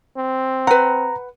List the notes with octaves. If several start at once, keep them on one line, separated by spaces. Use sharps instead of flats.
C4
B4 F#5 A#5